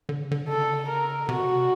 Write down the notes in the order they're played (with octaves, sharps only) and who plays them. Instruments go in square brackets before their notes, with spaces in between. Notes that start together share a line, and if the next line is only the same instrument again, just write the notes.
[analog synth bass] D3
C#3
D3
[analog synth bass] C#3 [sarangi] A4
[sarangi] A#4
[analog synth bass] C3 [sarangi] F#4